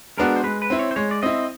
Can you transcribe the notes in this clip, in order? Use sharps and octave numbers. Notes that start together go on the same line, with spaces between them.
G#3 B3 D4 F#4 A#4
C5
G#3 B4
B4
C4 E4
C#5
C5
G#3 C#5
D5
C4 E4 D#5